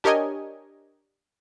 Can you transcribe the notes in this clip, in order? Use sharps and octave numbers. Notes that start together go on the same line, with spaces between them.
D4 G4 A#4 C#5 D#5 G#5